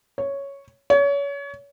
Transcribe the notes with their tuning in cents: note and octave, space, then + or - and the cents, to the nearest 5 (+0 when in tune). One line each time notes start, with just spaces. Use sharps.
C#5 +0
C#5 +30